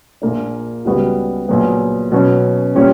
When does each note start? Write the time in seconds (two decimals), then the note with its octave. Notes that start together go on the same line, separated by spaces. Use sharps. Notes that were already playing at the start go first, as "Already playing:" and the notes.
0.22 A#1 A#2 A#3 D4
0.85 C#2 C#3 G3 B3 F#4
1.49 A#1 A#2 F#3 B3
2.12 B2 F#3 C#4
2.75 A#2 G3 C#4